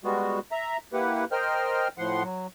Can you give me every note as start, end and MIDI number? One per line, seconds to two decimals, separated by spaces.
0.04 0.39 55
0.04 0.39 56
0.04 0.39 59
0.04 0.39 66
0.52 0.77 76
0.52 0.77 82
0.93 1.25 58
0.93 1.25 64
0.93 1.25 67
0.93 1.25 71
0.93 1.25 78
1.32 1.88 70
1.32 1.88 72
1.32 1.88 75
1.32 1.88 79
1.32 1.88 89
1.98 2.23 45
1.98 2.23 53
1.98 2.23 78
1.98 2.23 84
2.23 2.47 54